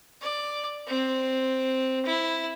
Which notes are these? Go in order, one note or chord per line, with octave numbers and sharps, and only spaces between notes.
D5
C4
E4